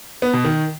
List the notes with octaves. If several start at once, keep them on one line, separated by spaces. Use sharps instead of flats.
B3
B2
D#3